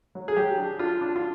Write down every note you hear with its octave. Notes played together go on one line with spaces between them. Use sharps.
F#3
G#4
F#3 G4
D4
D4 F4
D4
F4